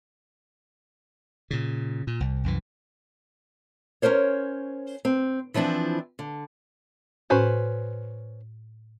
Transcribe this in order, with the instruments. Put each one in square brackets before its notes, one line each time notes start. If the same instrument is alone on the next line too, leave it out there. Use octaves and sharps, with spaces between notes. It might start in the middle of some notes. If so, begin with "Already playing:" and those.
[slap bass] A#2 C#3
A#2
C2
C2 F#2 E3
[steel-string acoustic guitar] C#4 D#4 A#4 C5 C#5
C4
E3 F3 C4 D4 E4
D3
[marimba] A2 F#4 [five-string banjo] C#4 B4 C5